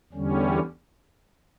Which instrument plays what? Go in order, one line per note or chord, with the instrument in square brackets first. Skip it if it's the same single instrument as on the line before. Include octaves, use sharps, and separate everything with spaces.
[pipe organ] E2 D3 G3 C#4